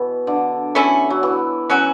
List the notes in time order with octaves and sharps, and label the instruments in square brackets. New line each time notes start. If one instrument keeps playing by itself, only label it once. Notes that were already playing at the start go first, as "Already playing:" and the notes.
Already playing: [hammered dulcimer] B2 E3
D3
[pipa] A3 C#4 E4
[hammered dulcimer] F#3
E3
[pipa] F#3 C#4 F#4